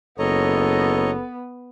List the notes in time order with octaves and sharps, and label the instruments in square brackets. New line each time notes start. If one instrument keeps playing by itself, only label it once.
[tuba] F#1 [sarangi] B3 [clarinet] A4 [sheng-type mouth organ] C#5 D#5 A#5